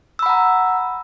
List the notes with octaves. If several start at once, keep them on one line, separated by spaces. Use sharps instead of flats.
F#5 A#5 B5 E6